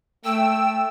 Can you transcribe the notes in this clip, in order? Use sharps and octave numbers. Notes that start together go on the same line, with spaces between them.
A3 G5 E6